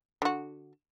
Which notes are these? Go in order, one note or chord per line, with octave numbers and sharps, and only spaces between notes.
D3 F#4